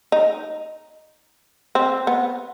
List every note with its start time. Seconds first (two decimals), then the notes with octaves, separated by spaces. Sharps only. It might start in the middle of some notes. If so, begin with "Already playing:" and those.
0.12 D#4
1.75 C4
2.07 B3